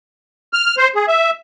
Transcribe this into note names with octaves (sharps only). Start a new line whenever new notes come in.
F6
C5
G#4
E5